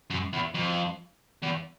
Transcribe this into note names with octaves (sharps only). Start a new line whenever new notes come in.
F#2
E2
F2
E2